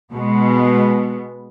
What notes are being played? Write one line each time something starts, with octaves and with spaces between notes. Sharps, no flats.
B2 G#3 B3